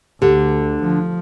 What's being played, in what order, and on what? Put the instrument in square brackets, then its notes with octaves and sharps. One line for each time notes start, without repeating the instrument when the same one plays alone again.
[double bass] D2 [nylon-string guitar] D3 [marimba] G4
[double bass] F3